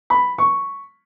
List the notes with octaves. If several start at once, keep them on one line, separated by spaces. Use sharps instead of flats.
B5
C#6